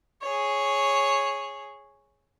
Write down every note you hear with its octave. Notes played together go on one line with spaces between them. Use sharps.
G#4 C#5